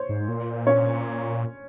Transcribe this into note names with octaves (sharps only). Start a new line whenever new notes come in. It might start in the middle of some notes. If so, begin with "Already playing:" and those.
Already playing: C5 C#5
G#2
A#2
C#4 C#5